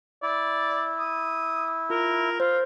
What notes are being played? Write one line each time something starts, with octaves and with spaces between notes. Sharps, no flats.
E4 D5
D#6
F4 A#4
F4 C5